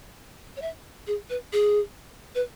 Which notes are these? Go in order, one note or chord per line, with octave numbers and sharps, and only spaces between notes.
C#5
E5
G#4
B4
G#4
B4